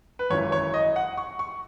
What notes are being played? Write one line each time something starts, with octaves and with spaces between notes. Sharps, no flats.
B4
G#1 F#2 E3 C#5
C#5
D#5
F#5
C#6
C#6